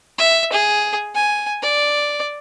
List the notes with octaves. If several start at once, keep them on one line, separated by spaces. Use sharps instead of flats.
E5
G#4
G#5
D5